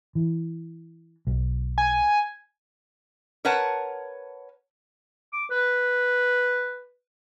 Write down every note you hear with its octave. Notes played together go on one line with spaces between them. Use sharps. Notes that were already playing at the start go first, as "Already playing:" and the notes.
E3
B1
G#5
A#4 B4 C#5 F#5 A5
D6
B4